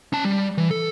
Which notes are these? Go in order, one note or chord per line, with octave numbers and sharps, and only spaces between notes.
C#4 A5
G3
E3
A4